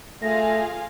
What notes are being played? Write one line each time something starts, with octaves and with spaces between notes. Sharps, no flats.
A3 F4 G#4 F5 A#6